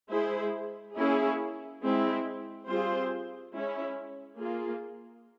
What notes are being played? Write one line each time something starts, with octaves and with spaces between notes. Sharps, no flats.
G#3 E4 G#4 C5
A#3 C#4 E4 G#4
G#3 C4 E4
G3 C4 F4 G#4 C5
G#3 C#4 E4
A#3 F4 G#4